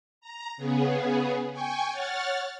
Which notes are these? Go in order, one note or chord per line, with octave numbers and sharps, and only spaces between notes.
A#5
C#3 B3 G#4
G5 G#5 C#6
C#5 F#5 F6 A6